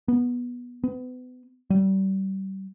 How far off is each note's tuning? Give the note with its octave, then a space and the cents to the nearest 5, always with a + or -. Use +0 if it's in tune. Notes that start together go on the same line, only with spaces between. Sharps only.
B3 -15
B3 +30
G3 -30